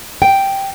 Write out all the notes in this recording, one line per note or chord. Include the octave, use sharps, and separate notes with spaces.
G5